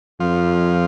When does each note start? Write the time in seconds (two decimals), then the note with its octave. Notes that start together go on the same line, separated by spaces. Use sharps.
0.20 F2 F3